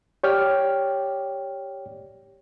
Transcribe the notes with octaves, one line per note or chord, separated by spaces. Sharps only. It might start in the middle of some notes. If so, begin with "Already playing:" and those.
G4 C#5 D5 G5 F6